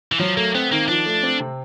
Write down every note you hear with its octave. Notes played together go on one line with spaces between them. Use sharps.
E3
F3 F#3
A3 A#3
B3 C4
D#3 A#3
F3 D4
A3
C4
C3